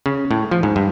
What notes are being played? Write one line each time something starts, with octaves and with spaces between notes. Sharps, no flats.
C#3
A2
F3
G#2
G2